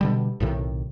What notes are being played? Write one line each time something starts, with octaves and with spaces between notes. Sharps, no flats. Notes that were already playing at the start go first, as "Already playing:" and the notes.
B2 D3 G3
B1 A2 C3 D#3